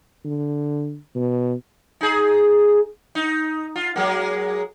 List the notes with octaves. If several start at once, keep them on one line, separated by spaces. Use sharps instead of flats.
D3
B2
D#4 G#4
D#4
F4
F#3 G#3 A#3